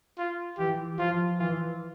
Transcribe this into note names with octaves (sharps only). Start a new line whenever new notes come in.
F4
E3 G4
F3 F4
E3 F4